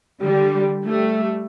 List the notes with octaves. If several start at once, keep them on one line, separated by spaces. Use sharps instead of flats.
D3 G3
G3 A3